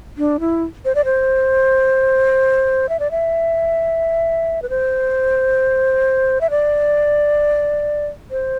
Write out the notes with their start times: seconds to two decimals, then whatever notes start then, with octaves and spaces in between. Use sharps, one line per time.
0.18 D4
0.40 E4
0.85 C5
0.95 D5
1.05 C5
2.89 E5
2.99 D5
3.11 E5
4.62 B4
4.70 C5
6.41 E5
6.50 D5
8.31 C5